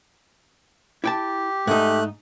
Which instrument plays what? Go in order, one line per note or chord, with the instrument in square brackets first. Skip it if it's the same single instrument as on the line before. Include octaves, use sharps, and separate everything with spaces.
[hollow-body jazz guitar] E4 G5 A5 [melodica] G4
[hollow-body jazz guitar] G#2 D#4 [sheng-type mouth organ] A3 F#6